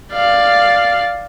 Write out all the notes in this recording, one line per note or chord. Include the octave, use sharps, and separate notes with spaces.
D5 F5